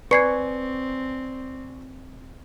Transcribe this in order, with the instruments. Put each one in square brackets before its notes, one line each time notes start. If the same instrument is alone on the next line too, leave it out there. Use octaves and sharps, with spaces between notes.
[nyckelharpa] C4 [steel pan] B4 [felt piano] D5 G#5 C#6 [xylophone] G#6 C7 C#7